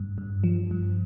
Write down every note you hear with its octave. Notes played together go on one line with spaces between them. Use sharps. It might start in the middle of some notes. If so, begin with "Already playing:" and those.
Already playing: G2
G2
F3
G2